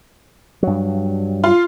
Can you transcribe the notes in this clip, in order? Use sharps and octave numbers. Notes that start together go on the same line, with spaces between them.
G2 F#3
F4